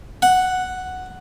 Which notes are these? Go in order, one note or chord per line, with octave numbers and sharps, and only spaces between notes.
F#5